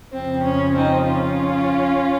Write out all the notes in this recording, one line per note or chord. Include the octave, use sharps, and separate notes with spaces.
F2 C#3 F3 C4
C#4
C4 D#4
C#4 F4